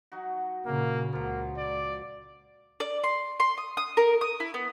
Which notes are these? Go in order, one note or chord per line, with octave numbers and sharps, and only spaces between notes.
F#3 D#4 F#4
A#2 C#3 A#3
C#2 F3 F#3 A#3
D5
D5
C6
C6
D#6
D#6
A#4
D#6
E4
B3